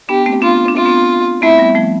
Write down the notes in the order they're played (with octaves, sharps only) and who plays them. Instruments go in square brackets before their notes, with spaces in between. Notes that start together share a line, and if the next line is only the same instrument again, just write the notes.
[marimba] B3 D4 [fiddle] G4
[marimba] A3 C4
[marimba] B3 D4 [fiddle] F4
[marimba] D4
[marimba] C4 [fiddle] F4
[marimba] B3 D4
[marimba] A3 C4 [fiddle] E4
[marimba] G3 B3
F3 A3